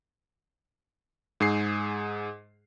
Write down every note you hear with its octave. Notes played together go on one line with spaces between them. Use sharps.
G#2 G#4 C7